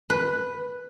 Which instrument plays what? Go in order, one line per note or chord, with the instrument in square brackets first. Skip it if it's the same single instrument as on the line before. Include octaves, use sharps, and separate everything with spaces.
[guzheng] B4